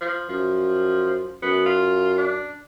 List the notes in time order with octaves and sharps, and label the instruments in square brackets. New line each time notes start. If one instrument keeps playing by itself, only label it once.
[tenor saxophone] F3
[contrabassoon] F#2 [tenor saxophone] F3
[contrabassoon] F#2 [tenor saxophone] B3
[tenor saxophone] F4
D4